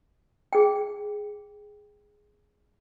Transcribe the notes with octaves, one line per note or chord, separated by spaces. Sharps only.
G#4 G5